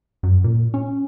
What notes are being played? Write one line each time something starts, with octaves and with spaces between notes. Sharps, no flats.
F#2
A#2
C#4